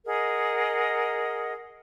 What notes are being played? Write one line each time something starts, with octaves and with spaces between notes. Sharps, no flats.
G#4 A#4 D#5 F#5